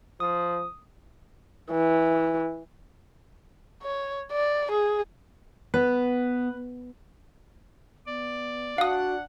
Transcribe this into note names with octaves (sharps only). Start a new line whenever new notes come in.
F3 D#6
E3
C#5
D5
G#4
B3 B4
B3 D5
D4 F#4 F5 F#5 D#6